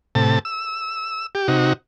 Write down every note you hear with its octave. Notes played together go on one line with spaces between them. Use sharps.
A2 C3 A5
E6
G4
C3 D#4 F#4